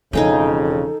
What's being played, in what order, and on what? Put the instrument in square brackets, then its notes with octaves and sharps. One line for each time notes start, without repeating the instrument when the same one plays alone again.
[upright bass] E1 E3 [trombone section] F2 C#3 [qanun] D#4 G#4 G5 [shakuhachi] A4